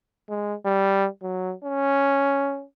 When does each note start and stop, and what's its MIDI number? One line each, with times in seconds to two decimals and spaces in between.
0.29 0.54 56
0.65 1.08 55
1.22 1.54 54
1.64 2.65 61